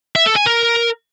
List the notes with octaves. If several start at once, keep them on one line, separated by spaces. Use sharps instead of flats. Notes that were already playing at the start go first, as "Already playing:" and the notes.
E5
A4
G#5
A#4